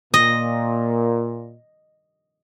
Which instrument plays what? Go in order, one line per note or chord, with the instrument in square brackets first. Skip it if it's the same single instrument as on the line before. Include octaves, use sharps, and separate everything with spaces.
[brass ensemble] A#2 [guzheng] D#5